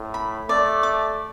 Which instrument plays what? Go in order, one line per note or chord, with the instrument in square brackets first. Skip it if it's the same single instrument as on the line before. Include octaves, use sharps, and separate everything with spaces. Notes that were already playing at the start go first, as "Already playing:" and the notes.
Already playing: [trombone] A2
[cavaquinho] B5
[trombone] A3 [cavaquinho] D5
[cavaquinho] D6